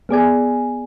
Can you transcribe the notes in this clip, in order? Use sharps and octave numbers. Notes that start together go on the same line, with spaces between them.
B3 G#4 D5 G#5